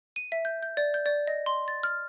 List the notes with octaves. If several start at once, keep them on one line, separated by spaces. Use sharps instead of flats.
D#7
E5
G6
G6
D5
G6
D5
D#5
C6
A6
F6